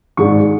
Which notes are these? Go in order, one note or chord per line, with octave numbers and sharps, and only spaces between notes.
G#1 G#2 G#3 D4 C#6